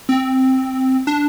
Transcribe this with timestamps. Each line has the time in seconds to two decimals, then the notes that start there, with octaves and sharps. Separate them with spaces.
0.09 C4
1.07 D4